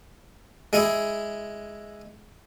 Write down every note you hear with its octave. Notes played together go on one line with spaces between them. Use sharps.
G#3 E4 G#4